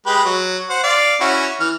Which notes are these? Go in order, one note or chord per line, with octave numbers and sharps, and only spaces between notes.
G#3 G4 B4
F#3
C5 F#5
D5 F5
C#4 E4 F#4
E3 F6